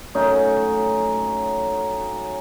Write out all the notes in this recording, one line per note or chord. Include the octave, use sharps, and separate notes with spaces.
F#3 A3 C#4 D#4